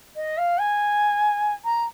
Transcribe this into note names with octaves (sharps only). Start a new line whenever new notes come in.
D#5
F5
G#5
A#5